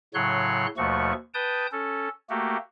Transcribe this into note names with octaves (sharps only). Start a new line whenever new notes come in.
A2 C#3 F#3 C#5 C6 F#6
D#2 B2 F3 A3 F#4 C#6
B4 G5 A5 D#6 G6
C#4 A4
A3 A#3 F#4 G4